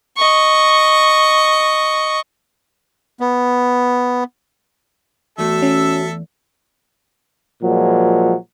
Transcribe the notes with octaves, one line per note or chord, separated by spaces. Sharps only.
D#5 C#6
B3
E2 A3 F#4 A4 E5
C#4
A#2 F3 F#3 G#3